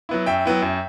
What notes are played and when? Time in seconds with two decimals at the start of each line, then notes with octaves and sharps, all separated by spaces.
0.09 F#3 B3 E4
0.26 F#2 E5 G5
0.45 F#3 B3 E4
0.62 F#2